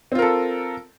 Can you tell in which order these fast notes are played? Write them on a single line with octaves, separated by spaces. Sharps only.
C4 F4 A#4 A4